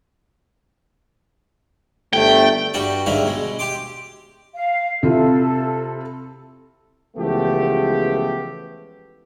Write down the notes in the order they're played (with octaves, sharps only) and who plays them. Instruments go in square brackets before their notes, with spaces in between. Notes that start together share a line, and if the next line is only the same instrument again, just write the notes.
[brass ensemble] G1 A3 [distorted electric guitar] G5
[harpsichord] G2 G3 F#4 G5
G#2 D3 G3 E5 F5
B2 G#3
G4 C6 D6
[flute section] F5
[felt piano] C3 E4 F4 [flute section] A4
[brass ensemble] C#2 E3 F3 A3 B3 G4